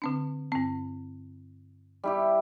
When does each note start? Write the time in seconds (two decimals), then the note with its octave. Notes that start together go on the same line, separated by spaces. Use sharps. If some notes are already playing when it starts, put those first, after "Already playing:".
0.02 D3 C4 D4
0.52 G2 C4
2.04 G3 E4 G4